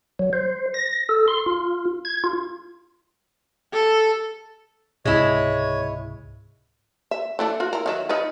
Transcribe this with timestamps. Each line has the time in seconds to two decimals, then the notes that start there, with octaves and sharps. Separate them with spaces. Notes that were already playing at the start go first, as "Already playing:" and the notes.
0.19 F#3
0.33 C5
0.74 A#6
1.09 A4
1.28 C6
1.46 F4
2.05 G#6
2.24 F4
3.73 A4
5.05 C#2 G#2 C3 G#3 E4 C#5
7.11 E5
7.39 E3 A3 D4
7.60 F4 F#4
7.73 E4 A#4
7.86 D#3 F#3 E5
8.09 D#4 F4 B4